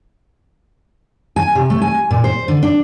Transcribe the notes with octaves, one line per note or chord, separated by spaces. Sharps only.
G#5
C3
A3
G#5
A#2
C5
D3
D4